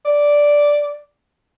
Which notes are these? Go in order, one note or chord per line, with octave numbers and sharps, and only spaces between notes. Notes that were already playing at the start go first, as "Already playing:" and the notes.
D5